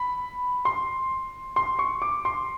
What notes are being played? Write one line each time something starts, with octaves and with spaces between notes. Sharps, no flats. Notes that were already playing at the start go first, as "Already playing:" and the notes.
Already playing: B5
C6
C6
C#6
D6
C6